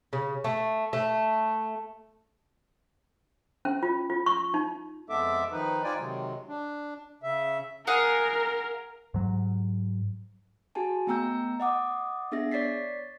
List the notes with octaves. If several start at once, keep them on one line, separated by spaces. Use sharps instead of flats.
C#3
A3
A3
C#4
F4
F4
C#6
D#4
F2 G#3 B3 A4 E5 D6
D#3 F3 D#4 B4
D#4 F4 C5 D5 G5 G#5
C3 D#3 F#3 G#3
D4
C#3 E5
G#4 A#4 F5 F#5
G#2 F#3
F#4 G#4 G#5 A5
A3 B3 G5 A#5 E6 G6
D#5 F#5 D6 D#6
B3 D4 G#4 E5 A#6
C#5 D5 A6 B6 C7